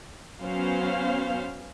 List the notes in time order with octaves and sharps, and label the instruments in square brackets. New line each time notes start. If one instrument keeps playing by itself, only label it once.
[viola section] F#3 B3 C#4 C5 F5